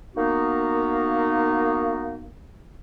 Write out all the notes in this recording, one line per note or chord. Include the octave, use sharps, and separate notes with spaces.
A#3 B3 D#4 F#4